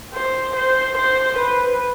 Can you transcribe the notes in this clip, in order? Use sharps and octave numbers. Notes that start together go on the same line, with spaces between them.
C5
C5
C5
B4